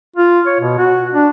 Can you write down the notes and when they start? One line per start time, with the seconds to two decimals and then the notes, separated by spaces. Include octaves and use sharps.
0.16 F4
0.47 C#5
0.60 B2
0.78 F#4
1.13 D4